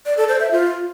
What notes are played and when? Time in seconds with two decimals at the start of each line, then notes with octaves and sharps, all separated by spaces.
0.06 D5
0.17 A4
0.29 C5
0.40 E5
0.51 F4